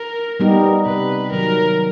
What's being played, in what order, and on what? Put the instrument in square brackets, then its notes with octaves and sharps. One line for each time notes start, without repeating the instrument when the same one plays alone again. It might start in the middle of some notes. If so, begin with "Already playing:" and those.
Already playing: [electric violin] A#4
[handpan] G3 B3 D#4 G4
[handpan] C3 [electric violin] B4
[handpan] D#3 F#3 [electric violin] A#4